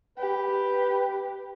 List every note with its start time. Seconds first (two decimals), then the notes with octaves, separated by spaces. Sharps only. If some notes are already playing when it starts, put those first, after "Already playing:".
0.18 G4 B4